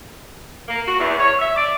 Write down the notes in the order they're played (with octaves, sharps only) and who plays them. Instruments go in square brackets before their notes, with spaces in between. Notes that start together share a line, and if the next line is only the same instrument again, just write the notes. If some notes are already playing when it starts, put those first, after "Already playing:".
[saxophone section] A#3
F#4
E2
C#5
E5
D5